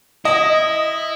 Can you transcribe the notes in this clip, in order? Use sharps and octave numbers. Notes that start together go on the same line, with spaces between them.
E4 D#5